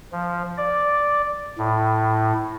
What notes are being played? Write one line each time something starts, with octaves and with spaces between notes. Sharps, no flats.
F3
D5
A2